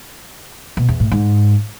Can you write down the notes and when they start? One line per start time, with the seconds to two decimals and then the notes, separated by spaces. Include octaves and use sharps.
0.77 B2
0.89 E2
1.00 A2
1.11 G#2